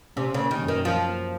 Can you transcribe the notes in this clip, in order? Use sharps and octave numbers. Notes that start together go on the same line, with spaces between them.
C3 C#4
C#3 A#3
D#3
F#2
D#3
F3 F4
A#3